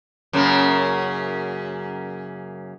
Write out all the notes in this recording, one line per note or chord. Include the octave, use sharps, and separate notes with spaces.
F#2 C#3 A#3